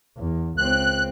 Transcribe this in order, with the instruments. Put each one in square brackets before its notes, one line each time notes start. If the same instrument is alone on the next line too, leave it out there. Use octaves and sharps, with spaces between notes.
[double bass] E2
[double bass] C#2 C4 [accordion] F#6